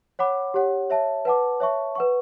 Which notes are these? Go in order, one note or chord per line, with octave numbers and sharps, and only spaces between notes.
C#5 F#5 B5 D6
G4 C#5 F#5
C#5 E5 A5
B4 F#5 A5 D6
C#5 E5 A5 C#6
B4 F#5 C#6